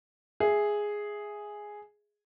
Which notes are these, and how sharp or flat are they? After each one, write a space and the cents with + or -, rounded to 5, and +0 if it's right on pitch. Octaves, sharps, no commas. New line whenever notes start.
G#4 +0 E5 +0